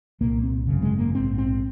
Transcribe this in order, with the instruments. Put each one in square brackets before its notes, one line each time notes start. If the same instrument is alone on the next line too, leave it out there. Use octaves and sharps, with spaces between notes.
[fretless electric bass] C2 A#2 A#3
C4
G#1 F#2 C#3
G#3
A#3
A#1 G#2 C4
C4